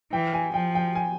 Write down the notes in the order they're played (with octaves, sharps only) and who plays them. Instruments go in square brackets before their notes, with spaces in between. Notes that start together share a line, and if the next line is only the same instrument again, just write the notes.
[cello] E3 [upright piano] G5
[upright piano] G#5
[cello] F3 [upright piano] G5
[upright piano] G5
G#5